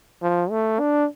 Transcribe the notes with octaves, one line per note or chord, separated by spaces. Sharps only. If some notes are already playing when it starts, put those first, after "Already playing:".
F3
A3
D4